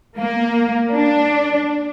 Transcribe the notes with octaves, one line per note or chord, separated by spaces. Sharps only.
A#3
D4